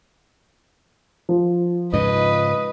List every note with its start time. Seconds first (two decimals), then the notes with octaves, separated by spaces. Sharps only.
1.29 F3
1.94 G#2 C#3 B4 D#5